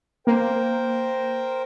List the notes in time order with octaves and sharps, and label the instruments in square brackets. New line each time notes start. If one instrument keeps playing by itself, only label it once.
[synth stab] A#3 [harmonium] A#4 C5 G5